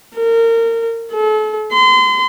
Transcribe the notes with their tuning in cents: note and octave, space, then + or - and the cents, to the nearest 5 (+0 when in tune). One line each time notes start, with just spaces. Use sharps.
A#4 -25
A4 -40
C6 -35